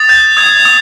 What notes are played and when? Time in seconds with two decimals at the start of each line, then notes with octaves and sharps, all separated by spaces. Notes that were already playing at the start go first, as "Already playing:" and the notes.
Already playing: D#6 A6
0.09 G6
0.37 D#6 G#6
0.65 D#6